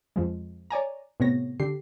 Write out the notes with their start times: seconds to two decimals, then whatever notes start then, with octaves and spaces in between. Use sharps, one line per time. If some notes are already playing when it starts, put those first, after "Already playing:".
0.16 F2 F3 G#3
0.71 C#5 D5 G#5 A#5
1.20 A2 C3 B3 C#5 A#6
1.60 D3 G4 C7